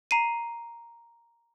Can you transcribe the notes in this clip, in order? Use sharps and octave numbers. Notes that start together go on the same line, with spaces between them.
A#5 C7 D#7